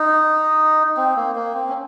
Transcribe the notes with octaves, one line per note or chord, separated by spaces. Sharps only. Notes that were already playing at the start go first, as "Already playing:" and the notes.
Already playing: D#4
C4
A#3
A#3
C4
C#4